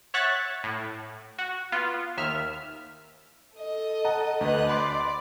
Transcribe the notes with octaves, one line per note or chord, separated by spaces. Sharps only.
C#5 E5 F#5 C#6 F#6 A6
A2
F#4
B3 F4
D#2 E5 F6
A4 D#5
F#5 A5 A#5
D2 B4 D#5 F#6
D5 B5 C6 D6